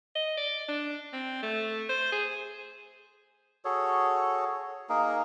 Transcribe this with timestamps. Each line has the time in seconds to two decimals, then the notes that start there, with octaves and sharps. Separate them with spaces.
0.15 D#5
0.37 D5
0.69 D4
1.13 C4
1.43 A3
1.89 C5
2.12 G#4
3.65 F#4 G#4 A4 C#5
4.89 A#3 D#4 G#4 A#4